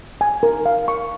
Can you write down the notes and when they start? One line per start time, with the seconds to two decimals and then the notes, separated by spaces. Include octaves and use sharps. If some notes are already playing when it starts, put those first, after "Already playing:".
0.21 G#5
0.43 A#4
0.66 F5
0.88 C#6